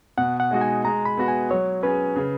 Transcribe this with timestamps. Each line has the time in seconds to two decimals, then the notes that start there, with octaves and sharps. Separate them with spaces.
0.17 B2 F#5
0.40 F#5
0.51 G#3 D#4 F#4
0.61 G#5
0.84 G#3 A#5
1.05 B5
1.17 B3 F#4
1.28 G#5
1.50 F#3 C#5
1.83 C#4 G#4 B4
2.16 C#3